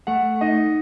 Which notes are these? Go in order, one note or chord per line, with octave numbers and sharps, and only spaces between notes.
A3 F#5
D#4 D#5